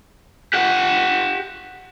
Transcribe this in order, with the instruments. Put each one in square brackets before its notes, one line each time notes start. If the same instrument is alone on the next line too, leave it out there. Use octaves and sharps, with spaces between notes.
[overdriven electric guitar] G4 F#5